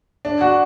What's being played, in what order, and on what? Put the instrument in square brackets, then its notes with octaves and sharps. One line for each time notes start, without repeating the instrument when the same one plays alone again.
[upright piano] D4
F#4